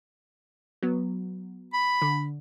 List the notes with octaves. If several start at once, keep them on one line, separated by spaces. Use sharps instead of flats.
F#3 B3
B5
D3